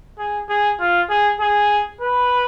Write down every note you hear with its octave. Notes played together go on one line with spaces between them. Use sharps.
G#4
G#4
F4
G#4
G#4
B4